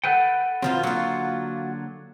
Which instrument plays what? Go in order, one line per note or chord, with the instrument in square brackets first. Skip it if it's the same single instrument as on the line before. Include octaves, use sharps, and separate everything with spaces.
[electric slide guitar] A4 B4 G5 [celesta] F#5 G6 D#7
[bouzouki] B2 F3 F4 [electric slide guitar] D#3 C4
[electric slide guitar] D3 F#3 A#3 [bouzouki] F4 F#4